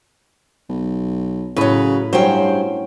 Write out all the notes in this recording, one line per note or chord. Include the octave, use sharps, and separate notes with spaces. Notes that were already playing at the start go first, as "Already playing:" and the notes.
B1
A2 C#3 F#3 B4
G2 F#3 C#4 C5 G5